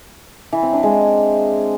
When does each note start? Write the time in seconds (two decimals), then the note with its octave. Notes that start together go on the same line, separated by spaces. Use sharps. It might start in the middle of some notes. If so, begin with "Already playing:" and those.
0.53 E3
0.63 C4
0.73 D4
0.83 G#3